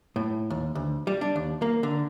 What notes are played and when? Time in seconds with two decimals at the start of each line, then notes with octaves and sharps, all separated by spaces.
0.16 A2
0.50 D#2
0.75 D2
1.07 G3
1.21 D4
1.36 D#2
1.62 A#3
1.83 D3